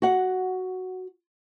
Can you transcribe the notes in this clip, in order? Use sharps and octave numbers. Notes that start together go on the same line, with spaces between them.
F#4 F#5